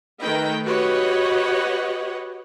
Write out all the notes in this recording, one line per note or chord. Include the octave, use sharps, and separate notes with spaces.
D#3 A3 D#4 B4 G5
F#4 G4 B4 C#5 D#5 F#5